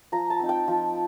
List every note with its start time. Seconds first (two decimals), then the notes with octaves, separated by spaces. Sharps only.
0.12 F3 A#5
0.30 A5
0.40 C4 D#4
0.49 G5
0.68 F3